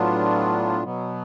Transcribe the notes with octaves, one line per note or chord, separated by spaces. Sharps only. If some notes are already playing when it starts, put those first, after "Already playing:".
Already playing: A2 F#3 B3 D4 F4
B2 F#3 B3